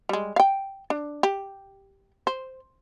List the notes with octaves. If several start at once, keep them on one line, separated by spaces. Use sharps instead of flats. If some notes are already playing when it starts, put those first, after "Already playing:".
G3 G#3
F5 G5
D4
G4
C5